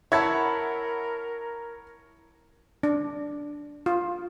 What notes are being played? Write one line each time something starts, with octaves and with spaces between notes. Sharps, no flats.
E4 A#4 C#5 E5 F#5 A5 G#6
D4
F4